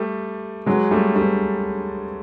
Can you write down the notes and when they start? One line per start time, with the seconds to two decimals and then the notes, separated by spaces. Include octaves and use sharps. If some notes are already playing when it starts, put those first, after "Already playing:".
Already playing: G3 A3
0.66 F#3 G#3
0.91 G3 A3
1.15 G3 A3